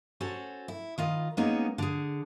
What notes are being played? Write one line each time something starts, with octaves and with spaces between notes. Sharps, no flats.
C#4 F#4 A4 C5
E4
D#3 F4 D#5
G#3 A#3 B3 C#4 D#4 G#4
D3 G#4